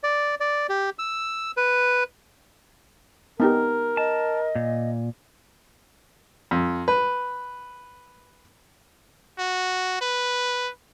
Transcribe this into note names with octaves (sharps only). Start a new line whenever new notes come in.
D5
D5
G4
E6
B4
B3 D#4 G4 A#4
D#5 A5
A#2
F2
B4
F#4
B4